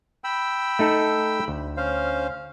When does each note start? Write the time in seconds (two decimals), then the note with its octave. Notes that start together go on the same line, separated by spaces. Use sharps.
0.24 G5 B5 E6
0.79 A3 D#4 A4
1.48 D2
1.77 C#4 C5 F5